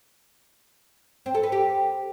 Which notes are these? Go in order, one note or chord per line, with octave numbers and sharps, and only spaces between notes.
C4
A4
B4
G4